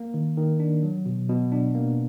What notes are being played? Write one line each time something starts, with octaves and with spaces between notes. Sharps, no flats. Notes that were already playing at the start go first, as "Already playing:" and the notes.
Already playing: A#3
D#3
D#3
D4
F#3
B2
B2
D4
A#3